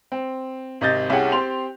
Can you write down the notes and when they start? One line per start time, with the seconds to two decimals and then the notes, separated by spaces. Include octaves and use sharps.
0.12 C4
0.81 G#1 C3 D#5 G6 A6
1.10 C2 C#4 G4 G#4 F#5
1.32 C4 G4 C6 F7